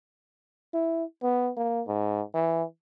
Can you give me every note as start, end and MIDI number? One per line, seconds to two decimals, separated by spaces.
0.74 1.04 64
1.23 1.51 59
1.57 1.82 58
1.87 2.22 44
2.35 2.63 52